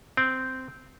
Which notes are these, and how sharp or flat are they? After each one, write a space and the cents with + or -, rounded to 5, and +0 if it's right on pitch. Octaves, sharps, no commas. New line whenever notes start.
C4 -10